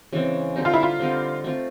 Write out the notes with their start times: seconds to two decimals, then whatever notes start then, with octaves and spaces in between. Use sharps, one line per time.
0.13 C#3 E3 G#3 C4
0.56 D3 G3 C4 D#4
0.65 F4
0.74 E4
0.83 F4
0.99 D3 G3 C4 D#4
1.44 A3 C4 F4